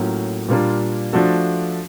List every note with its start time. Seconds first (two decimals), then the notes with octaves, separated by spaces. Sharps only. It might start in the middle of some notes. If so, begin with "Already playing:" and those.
Already playing: A2 F#3 A#3 C#4 F4
0.49 A#2 G3 A#3 D4 F4
1.13 F3 A3 D4 F#4 A4